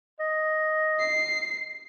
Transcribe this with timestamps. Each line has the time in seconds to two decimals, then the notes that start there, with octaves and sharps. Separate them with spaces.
0.20 D#5
0.99 C7